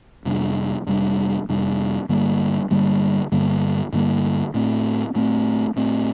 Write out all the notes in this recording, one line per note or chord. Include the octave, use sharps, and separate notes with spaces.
F2 C3 G3 D4
F2 C3 G3 D4
F2 C3 G3 D4
G2 D3 G3 A#3
G2 D3 G3 A#3
G2 D3 G3 A#3
G2 D3 G3 A#3
A2 A3 C4
A2 A3 C4
A2 A3 C4